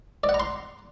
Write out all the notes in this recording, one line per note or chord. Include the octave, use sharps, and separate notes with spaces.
D5
F#5
A#5
C6